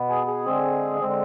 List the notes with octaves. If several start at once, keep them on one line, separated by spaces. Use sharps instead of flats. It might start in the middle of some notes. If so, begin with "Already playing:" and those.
Already playing: B2 B3
G#4
G#4
D3 G#3 C4
D3 G#3 C4